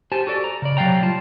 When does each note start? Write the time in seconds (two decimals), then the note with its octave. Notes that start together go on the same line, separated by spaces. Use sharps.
0.12 G4 C5 G#5 A5
0.27 F#4 A4 D5
0.44 A#5
0.62 C#3 D5
0.77 C3 F#3 D5 F5 G5 A#5
1.02 G3 F4 F5 A5